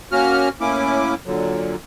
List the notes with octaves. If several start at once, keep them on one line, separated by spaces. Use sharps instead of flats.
A#3 C#4 F#4 F6
A2 A#3 C#4 E4 D6
A#2 D3 F#3